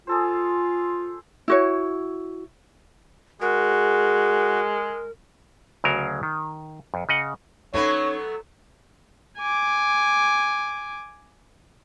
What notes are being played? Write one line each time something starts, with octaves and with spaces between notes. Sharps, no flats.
F4 G#4 A4 C5
E4 F#4 C#5
G#3 F#4 G#4 A#4
D2 C#3 F#3 A#4
D#3
F2
C#3 D#5 F#5
F#3 A3 B3 C#4 D#4 C#5
G#5 D6